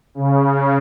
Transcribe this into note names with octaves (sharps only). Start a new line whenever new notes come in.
C#3